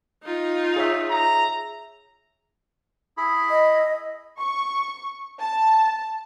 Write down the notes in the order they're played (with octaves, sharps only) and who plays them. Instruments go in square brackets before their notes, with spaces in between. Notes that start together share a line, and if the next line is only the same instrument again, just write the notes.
[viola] D#4 F4
[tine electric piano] G#4 C#5 E5
[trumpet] A#5
[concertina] E4 G#4 B5
[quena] D#5
[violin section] C#6
A5